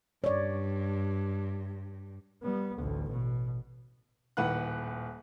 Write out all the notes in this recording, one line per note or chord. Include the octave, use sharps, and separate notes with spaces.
G2 C#5 D5
G3 B3
A1 D2
B2
D#1 A2 D#3 B4 F#5 F#6